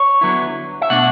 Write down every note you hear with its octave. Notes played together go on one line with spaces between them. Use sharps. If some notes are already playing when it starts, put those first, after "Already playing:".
Already playing: C#5
D3 F#3 B3 E4
E5
B2 A3 D4 F#5